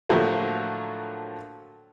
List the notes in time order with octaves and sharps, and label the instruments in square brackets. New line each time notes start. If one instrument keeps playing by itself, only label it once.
[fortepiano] A2 D3 F3 F#3 A3 A#3